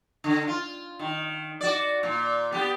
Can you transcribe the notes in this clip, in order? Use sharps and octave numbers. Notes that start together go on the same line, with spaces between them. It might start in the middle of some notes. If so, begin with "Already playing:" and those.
D3
F4
D#3
F#4 D5
A#2
B3 G4